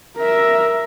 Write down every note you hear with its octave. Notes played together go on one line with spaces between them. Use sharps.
A#4 E5